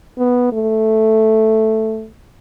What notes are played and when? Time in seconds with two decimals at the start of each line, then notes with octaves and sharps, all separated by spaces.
0.18 B3
0.52 A3